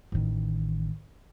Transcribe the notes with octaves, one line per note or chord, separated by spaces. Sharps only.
A1 D#3